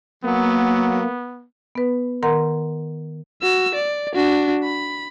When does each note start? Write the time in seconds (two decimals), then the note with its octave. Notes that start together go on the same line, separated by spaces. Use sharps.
0.24 F#3 A#3 B3
1.75 B3 B4
2.23 D#3 A#4 F#5 A#5 C6
3.42 F#4 E6
3.75 D5
4.15 D4 F#4
4.63 B5